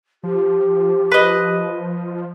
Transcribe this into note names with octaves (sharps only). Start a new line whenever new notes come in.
F3 G4
B4 D#5